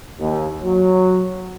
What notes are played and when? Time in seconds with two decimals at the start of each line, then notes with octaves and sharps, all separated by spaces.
0.19 D#2
0.63 F#3